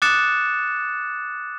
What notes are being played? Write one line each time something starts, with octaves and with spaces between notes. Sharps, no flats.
D6 D#6 F#6 A6 C#7 E7